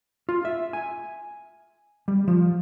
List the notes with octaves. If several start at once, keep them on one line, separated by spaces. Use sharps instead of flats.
F4
E5
G#5
G3
F3